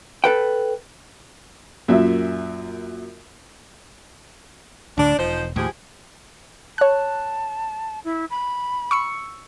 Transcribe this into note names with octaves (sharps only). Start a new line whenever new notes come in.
A4 B4 G5
F#2 A#2 E5
D2 A2 D3 D4
E1 F3 D#4 C5
D#2 A2 F3 G4 G#4
C#5 A5 F#6
E4
B5
C#6 E6 C#7